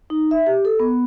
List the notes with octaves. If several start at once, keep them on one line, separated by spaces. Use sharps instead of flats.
D#4
E5
G4
A4
B3